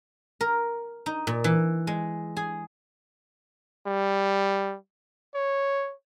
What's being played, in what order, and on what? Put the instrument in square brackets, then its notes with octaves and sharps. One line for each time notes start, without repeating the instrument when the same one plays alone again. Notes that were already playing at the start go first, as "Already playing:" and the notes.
[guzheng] A#4
D#4
A#2
E3
G#3
G#4
[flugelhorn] G3
C#5